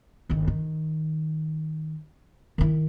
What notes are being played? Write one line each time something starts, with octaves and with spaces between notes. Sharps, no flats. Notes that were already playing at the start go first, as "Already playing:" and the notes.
G1 D#3
D#3
D#3 E4